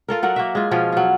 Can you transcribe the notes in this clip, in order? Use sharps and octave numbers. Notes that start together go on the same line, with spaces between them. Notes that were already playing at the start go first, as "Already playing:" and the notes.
F4 A4 A#4
F#3 A#4 F#5
A#3 F#4 E5
G#3 F4
B2 F3 C#4 F4
F#3 F4